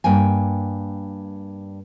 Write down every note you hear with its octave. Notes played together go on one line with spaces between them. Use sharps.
G2 A#3 G5 G#5